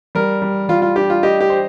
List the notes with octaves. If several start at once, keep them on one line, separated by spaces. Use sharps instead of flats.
G3 A#4
G3
G3 F4
F4
D4 G4
F4
G4 D#5
G4
C5